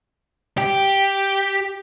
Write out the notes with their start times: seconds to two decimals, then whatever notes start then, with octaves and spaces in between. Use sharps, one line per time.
0.58 G4